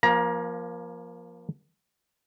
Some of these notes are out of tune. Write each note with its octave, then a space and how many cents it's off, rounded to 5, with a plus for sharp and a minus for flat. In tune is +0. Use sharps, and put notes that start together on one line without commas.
F3 +0 A#3 +25 A#5 +25